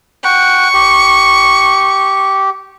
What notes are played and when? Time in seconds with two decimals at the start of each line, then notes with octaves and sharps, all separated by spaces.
0.24 F#5 G5 C#6
0.74 G4